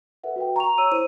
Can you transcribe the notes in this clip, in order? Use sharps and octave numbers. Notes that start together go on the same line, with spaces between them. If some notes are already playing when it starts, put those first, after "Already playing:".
A4 B4 E5 F#5
F#4 B4 G5
A#5 C#6 F7
C#5 E6 D#7
E4 C5 D#7